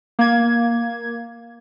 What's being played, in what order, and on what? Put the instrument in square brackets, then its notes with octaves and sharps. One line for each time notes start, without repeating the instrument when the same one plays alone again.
[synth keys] A#3 G#6